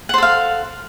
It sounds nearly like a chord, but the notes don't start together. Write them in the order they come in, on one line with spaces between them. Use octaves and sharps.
F#5 C5 A4 F5